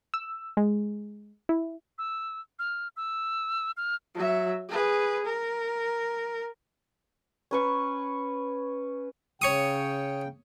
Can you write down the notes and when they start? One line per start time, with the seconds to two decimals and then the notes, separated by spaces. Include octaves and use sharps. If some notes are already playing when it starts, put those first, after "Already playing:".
0.14 E6
0.57 G#3
1.49 E4
1.98 E6
2.59 F6
2.97 E6
3.77 F6
4.15 F#3 E5
4.69 G#4 B4
5.25 A#4
7.51 C#4 B4 C#6
9.42 C#3 C#5 G5 C#6 D#6